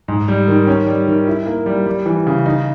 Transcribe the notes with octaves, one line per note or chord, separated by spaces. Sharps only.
G#2
G3
D#3
C#4
G3
D#3
E4
A#3
G3
G3
E3
C#3
D#4